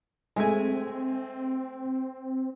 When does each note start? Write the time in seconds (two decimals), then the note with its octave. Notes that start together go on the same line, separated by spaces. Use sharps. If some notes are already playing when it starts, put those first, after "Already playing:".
0.36 G#3 A3 C4 G#5